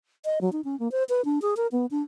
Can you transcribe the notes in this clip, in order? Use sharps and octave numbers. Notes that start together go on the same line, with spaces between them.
D#5
F#3
D#4
C#4
A#3
C5
B4
D4
G#4
A#4
B3
D4